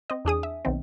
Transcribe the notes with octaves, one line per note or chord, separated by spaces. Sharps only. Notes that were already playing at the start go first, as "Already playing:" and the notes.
C4 D#5
E2 D4 G#4 D#6
E5
B1 D#3 C4